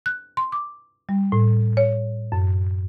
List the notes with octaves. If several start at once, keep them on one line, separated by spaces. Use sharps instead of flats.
F#6
C6
D6
G3
A2
C#5
F#2